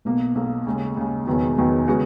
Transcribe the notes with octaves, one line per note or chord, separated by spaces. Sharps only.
B1 B2 A#3
B1 B2 A#3
D#2 C#3 G#3
D#2 C#3 G#3
E1 E2 D#3 F#3 B3
E1 E2 D#3 F#3 B3
C#3 G#3 B3 F#4